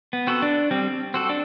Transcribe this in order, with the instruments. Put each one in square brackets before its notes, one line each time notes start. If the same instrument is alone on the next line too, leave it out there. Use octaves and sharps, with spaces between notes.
[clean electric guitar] B3
[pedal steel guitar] C4 F#4 A4
[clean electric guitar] D4
[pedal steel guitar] G3 [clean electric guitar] C4
[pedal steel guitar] C4 F#4 A4
[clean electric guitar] D4